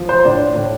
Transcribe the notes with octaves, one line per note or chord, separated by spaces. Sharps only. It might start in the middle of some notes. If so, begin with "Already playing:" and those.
Already playing: F3
C5
A2 D4
A2